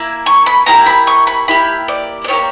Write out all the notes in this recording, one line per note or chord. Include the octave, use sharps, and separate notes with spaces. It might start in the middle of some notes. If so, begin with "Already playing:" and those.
Already playing: A#3 E4
C#6
B5
A#3 E4 G4 A#5
B5
C#6
B5
A#3 E4 G4 B5
D5
D5
A#3 E4 G4 C#5